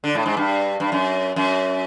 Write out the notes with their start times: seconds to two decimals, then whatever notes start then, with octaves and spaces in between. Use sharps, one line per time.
0.04 D3
0.15 A2
0.26 G#2
0.37 G2
0.80 G2
0.92 F#2
1.36 F#2